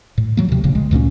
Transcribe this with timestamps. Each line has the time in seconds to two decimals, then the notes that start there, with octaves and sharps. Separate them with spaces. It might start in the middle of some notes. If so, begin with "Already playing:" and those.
0.18 A2
0.37 F3 F#3 A#3
0.49 D2 C3
0.64 D#1 A#1 C#3
0.75 B1 G#3
0.91 D2 A#2 F#3 C#4